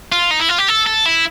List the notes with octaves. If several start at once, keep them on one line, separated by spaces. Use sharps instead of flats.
F4
D#4
E4
F4
G4
A4
A4
E4